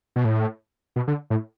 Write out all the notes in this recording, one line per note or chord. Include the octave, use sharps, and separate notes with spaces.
B2
A2
B2
D3
A2